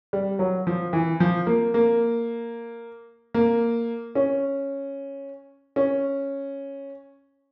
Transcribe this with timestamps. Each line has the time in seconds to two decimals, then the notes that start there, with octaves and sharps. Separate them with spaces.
0.13 G3
0.39 F#3
0.67 F3
0.93 E3
1.20 F3
1.46 A#3
1.74 A#3
3.34 A#3
4.15 C#4
5.76 C#4